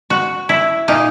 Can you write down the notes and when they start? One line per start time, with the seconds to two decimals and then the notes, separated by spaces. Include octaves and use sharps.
0.10 F#4
0.49 E4
0.88 A#2 A#3 D#4